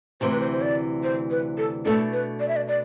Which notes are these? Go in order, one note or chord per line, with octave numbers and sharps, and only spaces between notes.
D2 C3 E3 C5
B4
C5
C5
D5
C5
B4
A4
B2 A3 D4 A4
B4
D5
E5
D5
D5